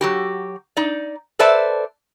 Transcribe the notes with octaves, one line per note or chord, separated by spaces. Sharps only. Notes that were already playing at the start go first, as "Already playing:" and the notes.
F#3 F#4 G4
D#4 D5
A4 B4 C5 D5 E5 A5